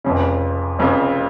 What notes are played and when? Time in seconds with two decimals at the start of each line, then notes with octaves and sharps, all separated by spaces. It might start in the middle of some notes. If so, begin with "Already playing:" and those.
0.04 F1 F2 C#3
0.79 F1 F2 C#3